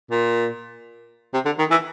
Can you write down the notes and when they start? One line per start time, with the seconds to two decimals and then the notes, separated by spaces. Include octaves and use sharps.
0.11 A#2
1.34 C3
1.45 D3
1.59 D#3
1.71 E3